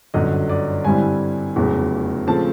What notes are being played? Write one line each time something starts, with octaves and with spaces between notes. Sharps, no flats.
G1 F#2 D3 D#5
D5
G2 D3 G3 C4 E4 G#5
F1 E2 C#3 F#3
C#3 F3 A3 C4 A5